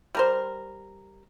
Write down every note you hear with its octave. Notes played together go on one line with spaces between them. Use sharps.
G3 A#4 C5